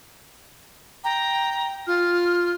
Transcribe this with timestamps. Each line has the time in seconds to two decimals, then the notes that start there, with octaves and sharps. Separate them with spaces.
1.04 G5 A#5
1.87 F4 F6